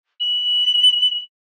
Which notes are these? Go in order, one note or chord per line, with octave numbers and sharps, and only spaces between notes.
F#7